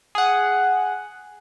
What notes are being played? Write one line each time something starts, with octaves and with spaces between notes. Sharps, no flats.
G#4 F#5